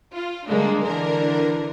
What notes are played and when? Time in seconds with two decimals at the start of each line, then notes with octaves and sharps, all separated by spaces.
0.13 F4
0.49 D3 G3 G#3 A#3 D4
0.85 D3 E3 D4 A#4